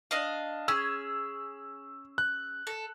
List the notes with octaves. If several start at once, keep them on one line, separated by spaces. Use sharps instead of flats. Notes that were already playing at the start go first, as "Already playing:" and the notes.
D4 D#5 F5
C#4 G#4 E6
F#6
A4